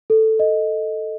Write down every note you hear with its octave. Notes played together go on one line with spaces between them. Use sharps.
A4
D#5